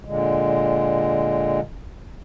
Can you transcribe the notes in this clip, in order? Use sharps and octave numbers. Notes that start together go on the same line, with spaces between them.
A#2 D3 G#3